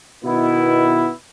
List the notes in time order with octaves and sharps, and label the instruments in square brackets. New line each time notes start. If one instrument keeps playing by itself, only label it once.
[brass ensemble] B2 D#3 B3 E4